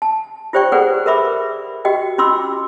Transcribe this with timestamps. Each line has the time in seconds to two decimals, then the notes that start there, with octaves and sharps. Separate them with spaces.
0.02 A5
0.53 F4 G4 C5 D5 G5 C#6
0.72 G#4 A4 B4 C5 D5 F#5
1.06 A#4 B4 E5 B5 D6
1.85 F#4 G4 D#5 G5
2.18 C#4 F4 B5 C6 D6 E6